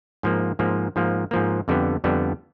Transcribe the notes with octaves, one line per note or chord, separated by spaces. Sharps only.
G#2 F3 A#3
G#2 F3 A#3
G#2 F3 A#3
G#2 F3 A#3
F2 D3 G3 B3
F2 D3 G3 B3